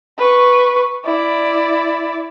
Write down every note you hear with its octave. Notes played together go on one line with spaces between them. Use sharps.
B4 C#6
E4 D5